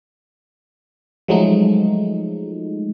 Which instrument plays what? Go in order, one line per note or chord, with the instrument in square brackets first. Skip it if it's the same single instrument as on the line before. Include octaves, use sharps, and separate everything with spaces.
[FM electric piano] F3 F#3 G#3 A3 D#4